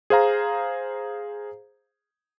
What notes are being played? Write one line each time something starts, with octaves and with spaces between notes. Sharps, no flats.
G#4 C5 F5 A#5